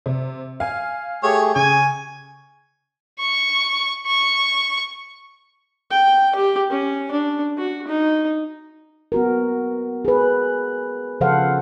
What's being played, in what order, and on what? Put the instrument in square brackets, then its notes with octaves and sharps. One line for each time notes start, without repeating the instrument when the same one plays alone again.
[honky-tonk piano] C3
F5 G#5
[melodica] A3 G4 G#4 [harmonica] C#5
[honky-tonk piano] C#3 [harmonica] G#5 [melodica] C#6
[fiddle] C#6
C#6
[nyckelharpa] G5
G4
C#4
D4
F#4
D#4
[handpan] B3 F#4 A#4
G#4 B4
C#3 F3 A4 C5 F5 F#5